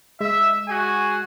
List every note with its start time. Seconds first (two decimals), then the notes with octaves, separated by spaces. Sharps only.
0.21 G#3 E5
0.68 F#4 G#4 G#5